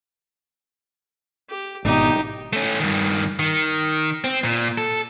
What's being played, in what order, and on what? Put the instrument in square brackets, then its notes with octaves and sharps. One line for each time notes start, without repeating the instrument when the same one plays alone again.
[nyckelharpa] G4
[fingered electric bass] G#1 B2 [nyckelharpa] D#4 G4
[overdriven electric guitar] A3 C#4
G2 D#3
D#3
C4
A#2
A4